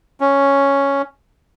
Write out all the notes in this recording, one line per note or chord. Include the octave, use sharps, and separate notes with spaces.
C#4